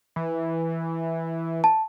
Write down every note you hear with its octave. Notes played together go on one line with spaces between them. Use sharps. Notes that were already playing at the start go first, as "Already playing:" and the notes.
E3
A5